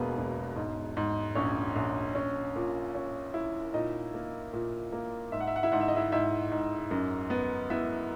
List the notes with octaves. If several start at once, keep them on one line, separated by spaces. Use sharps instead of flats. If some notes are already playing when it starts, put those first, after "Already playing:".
Already playing: E1 E2 B2 A#3 B3 G#4 B4
E1
G#2
G#2
A#1 C#4 C#5
A#1
C#4
A#2
C#4
E4
A#2 D#4 D#5
A#3
A#2
A#3
G#2 E5
F#5
E5
F#5
E4 E5
G#2 F#5
E5
D#5
E4 E5
G#2 E4 E5
G#2
F#2
B3
B3 E4 E5